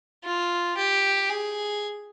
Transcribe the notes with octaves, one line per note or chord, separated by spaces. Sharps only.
F4
G4
G#4